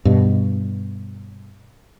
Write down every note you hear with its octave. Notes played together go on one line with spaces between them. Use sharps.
G2 B2